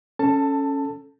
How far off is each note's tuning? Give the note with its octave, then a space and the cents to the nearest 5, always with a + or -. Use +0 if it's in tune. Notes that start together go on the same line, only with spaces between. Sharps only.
C#4 +0 A4 +0 A5 +15